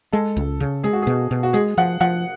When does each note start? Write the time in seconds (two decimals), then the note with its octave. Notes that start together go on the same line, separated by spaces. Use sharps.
0.12 G#3 A4
0.36 C#2
0.60 C#3
0.84 G#3 G#4
0.93 F#4
1.02 G#4
1.07 B2
1.31 B2
1.43 F#4
1.53 G#3 G#4
1.77 F3 F#5
2.01 F3 F#5